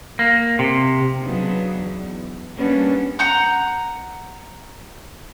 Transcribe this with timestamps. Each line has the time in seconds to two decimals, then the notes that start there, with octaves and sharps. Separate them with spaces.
0.19 A#3
0.59 C3
1.23 C#3 F#3 B3 D4 D#4
1.78 E2
2.56 G3 A#3 B3 C#4 D4
3.19 F#5 A#5 G6